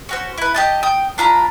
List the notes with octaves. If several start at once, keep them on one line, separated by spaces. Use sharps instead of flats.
C#4 F#4 C5
E4 B4
G4 D#5 A5
G5 D#6
D4 F4 A#5 B5